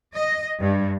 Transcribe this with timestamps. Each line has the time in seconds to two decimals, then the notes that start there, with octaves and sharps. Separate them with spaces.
0.16 D#5
0.59 G2